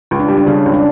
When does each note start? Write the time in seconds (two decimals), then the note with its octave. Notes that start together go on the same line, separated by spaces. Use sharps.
0.11 C#2
0.20 D4
0.28 G3
0.38 D4
0.47 C#3 C#4
0.66 C#2
0.74 D4